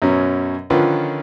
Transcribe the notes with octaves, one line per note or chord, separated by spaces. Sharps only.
F#2 B2 F#3 C#4
D3 D#3 F3 C#4 F4 B4